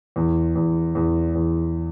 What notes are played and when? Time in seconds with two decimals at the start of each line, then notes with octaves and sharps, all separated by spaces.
0.16 E2
0.55 E2
0.95 E2
1.35 E2